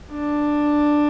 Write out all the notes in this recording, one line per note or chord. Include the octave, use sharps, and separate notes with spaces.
D4